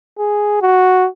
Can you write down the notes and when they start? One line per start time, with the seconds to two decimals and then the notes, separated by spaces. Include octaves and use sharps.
0.19 G#4
0.62 F#4